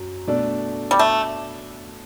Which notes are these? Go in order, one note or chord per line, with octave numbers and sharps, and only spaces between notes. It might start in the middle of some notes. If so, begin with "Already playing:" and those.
Already playing: F#2 F#3
B2 A3 D4 A4 D5
G3
A3